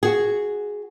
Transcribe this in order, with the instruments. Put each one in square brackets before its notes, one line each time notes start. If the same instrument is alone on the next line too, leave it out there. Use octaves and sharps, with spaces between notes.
[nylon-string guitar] F#4 G#4